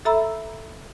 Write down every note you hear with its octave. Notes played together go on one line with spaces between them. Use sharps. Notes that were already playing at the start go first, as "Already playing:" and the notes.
A4 E5 A#5 B5 E6